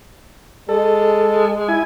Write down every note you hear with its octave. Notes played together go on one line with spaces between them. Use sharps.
G#3 A4
E4 G#5